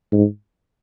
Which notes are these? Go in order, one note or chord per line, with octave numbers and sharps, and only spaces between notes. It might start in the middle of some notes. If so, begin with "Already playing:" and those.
G#2